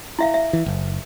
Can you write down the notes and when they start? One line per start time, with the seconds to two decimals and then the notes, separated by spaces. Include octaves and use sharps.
0.19 E4 E5 F5
0.34 E5
0.53 E3
0.66 F#1